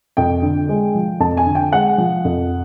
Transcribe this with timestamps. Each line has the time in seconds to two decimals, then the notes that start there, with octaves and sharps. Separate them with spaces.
0.17 F2 G5
0.42 D3
0.69 G#3
0.95 F3
1.20 F2 A5
1.37 G#5
1.46 D3
1.55 G5
1.73 G#3 F#5
1.98 F3
2.25 F2